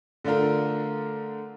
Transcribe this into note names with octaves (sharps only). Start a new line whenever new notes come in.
D3 A3 D4 F4 A#4